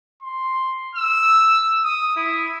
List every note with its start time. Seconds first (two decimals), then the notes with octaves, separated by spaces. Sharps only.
0.22 C6
0.96 E6
1.84 D#6
2.16 E4